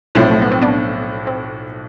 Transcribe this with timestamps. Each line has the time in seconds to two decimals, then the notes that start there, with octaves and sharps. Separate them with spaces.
0.15 B1 A2 F3 C4 E4
0.31 A3
0.42 B3
0.52 C4
0.62 B3 D4
1.27 C4